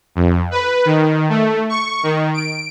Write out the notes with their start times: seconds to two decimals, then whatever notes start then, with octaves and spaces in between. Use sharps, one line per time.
0.16 F2
0.51 B4
0.85 D#3
1.29 A3
1.69 C#6
2.03 D#3
2.34 D7